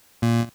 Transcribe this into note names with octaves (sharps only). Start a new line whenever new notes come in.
A#2